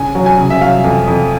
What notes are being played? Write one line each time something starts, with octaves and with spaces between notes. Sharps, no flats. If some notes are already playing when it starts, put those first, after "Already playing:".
Already playing: C#3 G#5
F#3
G#5
C#3
E5
F#3 F5
F2
F2